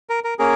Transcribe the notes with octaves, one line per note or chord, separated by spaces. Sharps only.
A#4
A#4
A#3 C#4 G#4 A#4